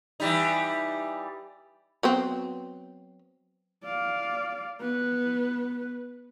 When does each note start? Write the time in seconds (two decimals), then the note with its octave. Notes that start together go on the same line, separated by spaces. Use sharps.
0.20 E3 G3 D#4
2.03 F#3 B3 C4
3.84 D5 F5
4.80 B3 B4